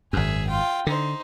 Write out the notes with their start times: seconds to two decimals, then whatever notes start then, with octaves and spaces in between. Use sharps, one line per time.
0.13 G#1 F#2 G#4 E5
0.47 F4 G5
0.87 D3 D#4 C5